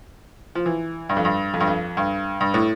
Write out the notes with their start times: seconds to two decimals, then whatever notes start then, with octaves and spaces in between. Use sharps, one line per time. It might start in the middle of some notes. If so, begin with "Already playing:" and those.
0.55 F3
0.66 E3
1.09 G2
1.17 F2
1.25 G2
1.54 F2
1.60 G2
1.68 F2
1.97 G2
2.40 G2
2.54 A2